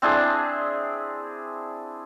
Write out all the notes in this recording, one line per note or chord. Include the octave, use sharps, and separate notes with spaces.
C4 D4 E4 G#4